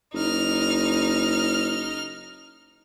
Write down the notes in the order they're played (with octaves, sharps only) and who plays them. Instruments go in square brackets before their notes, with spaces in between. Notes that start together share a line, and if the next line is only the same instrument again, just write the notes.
[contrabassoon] F#1 [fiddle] D#4 F6